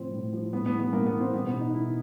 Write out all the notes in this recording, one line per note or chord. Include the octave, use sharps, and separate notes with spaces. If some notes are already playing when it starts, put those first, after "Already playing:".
Already playing: A2 F3 C4
A2
F3
A2 B3
B3
E3
B3
A2 A#3
B3
E3
C4
B2 B3
B3
B2
D#4
B2 E4